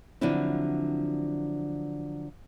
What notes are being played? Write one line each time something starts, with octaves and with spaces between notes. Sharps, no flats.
D3 F3 F#3 C4 D4 E4